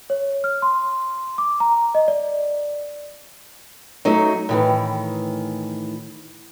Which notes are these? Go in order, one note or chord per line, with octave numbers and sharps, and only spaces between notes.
C#5
F6
C6
D6
A#5
D#5
D5
F#3 A3 D#4
A2 D#3 E3